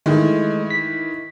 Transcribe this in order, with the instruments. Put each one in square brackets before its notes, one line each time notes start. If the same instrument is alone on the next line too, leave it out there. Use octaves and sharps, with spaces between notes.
[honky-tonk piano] D#3 E3 [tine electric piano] G#3 A3
[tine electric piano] B6